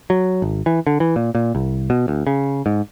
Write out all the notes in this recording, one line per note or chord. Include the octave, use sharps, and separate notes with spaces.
F#3
G#1
E3
D3
E3
A#2
A#2
C2
B2
D2
C#3
G#2